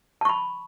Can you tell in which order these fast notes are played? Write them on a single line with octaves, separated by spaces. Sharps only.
A5 C#6 B5